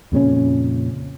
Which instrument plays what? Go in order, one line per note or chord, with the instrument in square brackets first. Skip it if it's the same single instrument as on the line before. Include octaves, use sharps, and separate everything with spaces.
[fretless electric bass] F2 A#2 C#3 C#4